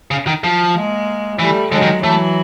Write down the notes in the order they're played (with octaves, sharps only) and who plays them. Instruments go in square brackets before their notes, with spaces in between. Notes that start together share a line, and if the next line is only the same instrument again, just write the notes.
[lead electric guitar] C#3
D#3
F3
[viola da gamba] G#3 A#3
[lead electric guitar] E3 [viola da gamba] G3 A3
[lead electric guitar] D3 [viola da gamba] F#3 G#3
[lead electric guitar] D#3
[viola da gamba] E3 F#3 [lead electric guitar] A3